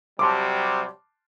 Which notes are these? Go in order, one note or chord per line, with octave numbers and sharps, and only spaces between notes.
C3 F#3 G3 A5 C6 D6